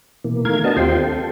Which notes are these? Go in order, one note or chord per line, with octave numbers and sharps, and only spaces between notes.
B2 E3 A#3
D#3 A3 A#4 F5 G#6
B3 D4 F#4 D#5 A5
D#2 C4 F4 G4 G5 C6
A4